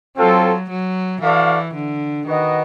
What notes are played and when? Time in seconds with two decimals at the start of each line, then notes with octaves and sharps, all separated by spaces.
0.17 F#3 C4 F4 A4
0.70 F#3
1.21 E3 F#4 A4 D5 F5
1.74 D3
2.26 D#3 F#4 B4 D#5 F#5